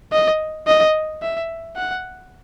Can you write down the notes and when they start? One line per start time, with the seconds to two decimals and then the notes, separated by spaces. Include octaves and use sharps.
0.12 D#5
0.67 D#5
1.22 E5
1.77 F#5